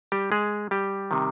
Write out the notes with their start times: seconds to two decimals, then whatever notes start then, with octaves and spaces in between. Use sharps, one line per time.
0.12 G3 G4
0.32 G#3 G#4
0.71 G3 G4
1.11 C3 D#3